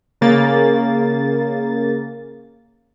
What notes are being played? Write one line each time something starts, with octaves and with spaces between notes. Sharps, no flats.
C#3 A#3 A6